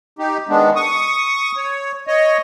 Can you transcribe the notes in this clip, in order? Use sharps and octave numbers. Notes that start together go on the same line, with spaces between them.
D#4 G4
D#3 G#3 B3 D4
C#6 D#6
C#5
C#5 D#5